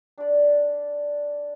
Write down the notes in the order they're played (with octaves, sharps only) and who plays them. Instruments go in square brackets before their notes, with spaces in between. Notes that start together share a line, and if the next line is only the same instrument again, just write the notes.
[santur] D4 D5